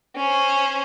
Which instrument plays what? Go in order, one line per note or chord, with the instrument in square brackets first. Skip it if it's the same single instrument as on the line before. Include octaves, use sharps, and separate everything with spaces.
[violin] C#4 C5